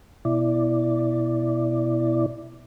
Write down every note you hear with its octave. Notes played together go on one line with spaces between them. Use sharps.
B2 E4 D5